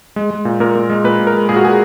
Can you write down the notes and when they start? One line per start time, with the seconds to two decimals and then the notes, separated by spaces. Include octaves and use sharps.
0.16 G#3
0.31 G#3
0.45 A#2
0.60 A#2 A#4
0.75 A#2
0.90 G#3
1.04 A#2 B4
1.19 A#2
1.27 A#4
1.33 G#3
1.49 A#2 G#4
1.56 F#4
1.63 A#2 G#4